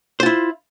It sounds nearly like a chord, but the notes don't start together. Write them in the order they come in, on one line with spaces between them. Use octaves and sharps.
C5 F4 E4